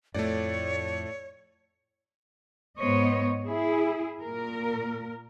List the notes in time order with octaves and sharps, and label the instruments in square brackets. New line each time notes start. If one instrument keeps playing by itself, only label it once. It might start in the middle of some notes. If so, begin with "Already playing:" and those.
[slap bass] F2 [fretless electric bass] A2 [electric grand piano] A3 D5 [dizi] C#5
[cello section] G#2 B3 C5 C#5 D#5
E4 G#4
A#2 A#4